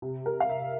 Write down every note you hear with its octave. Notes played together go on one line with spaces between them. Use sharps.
C3
A#4
F5
C3 E5